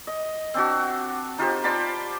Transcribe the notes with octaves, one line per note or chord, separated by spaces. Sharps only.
D#5
C4 D4 F#4
D#4 F4 G4 C5
C5 D5 A5 B5